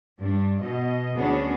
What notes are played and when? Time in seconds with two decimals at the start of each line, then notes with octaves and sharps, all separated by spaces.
0.20 G2 D4
0.61 B2 D#5
1.16 D2 B3 C#4 D4 F#4 G#4